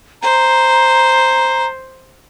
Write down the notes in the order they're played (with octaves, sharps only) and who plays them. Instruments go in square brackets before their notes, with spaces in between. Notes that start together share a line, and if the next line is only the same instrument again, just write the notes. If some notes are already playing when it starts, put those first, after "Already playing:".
[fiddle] C5 [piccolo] A#5